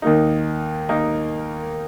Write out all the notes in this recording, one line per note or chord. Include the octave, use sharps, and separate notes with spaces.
D#2 D#3 A#3 D#4
D#2 D#3 A#3 D#4